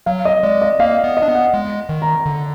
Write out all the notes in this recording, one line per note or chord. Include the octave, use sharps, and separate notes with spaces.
F#3 F5
D#5
G#3 D5
D#5
A#3 F5
B3
D#5
D4
B3
F#5
G#3
D#3
A#5
D3